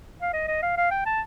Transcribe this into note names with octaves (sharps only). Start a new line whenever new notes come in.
F5
D#5
D#5
F5
F5
G5
A5